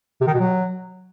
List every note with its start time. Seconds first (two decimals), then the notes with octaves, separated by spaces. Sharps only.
0.21 C3
0.27 D#3
0.34 B2
0.40 F#3